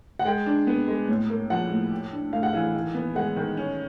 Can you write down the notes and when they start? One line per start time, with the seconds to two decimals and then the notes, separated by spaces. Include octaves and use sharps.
0.19 F#5
0.25 G#3 G5
0.46 D4
0.67 B3
0.87 G#3
1.08 A2
1.30 A#3
1.50 F3 F#5
1.71 A2
1.91 G4
2.12 D4
2.32 A3 F5
2.43 F#5
2.53 E3 F5
2.75 D#3
2.95 B3
3.15 G#3 F#5
3.36 D#3
3.57 C#4